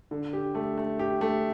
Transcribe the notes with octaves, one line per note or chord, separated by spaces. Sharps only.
D3
G4
A3
A3
G4
A3